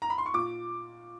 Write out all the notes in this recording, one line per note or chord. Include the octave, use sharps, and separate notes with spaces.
A#5
B5
C6
C#6
A#2 D6